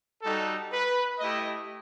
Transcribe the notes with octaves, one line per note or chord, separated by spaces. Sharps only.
G3 D#4 F#4 A4
B4
A3 E4 G4 D#5